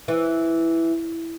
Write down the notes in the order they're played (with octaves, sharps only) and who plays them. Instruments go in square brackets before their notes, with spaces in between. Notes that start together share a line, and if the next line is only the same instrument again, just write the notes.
[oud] E3